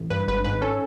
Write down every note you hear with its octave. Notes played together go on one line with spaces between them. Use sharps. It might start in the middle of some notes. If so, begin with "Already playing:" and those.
Already playing: A1
G2 B4
G#1 B4
G#2 B4
C#4 A4